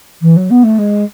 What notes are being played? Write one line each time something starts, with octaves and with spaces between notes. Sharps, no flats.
E3
F#3
B3
A3
G#3